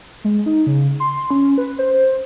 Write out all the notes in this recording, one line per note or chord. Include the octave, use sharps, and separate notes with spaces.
G#3
D#4
C#3
C6
C#4
B4
C5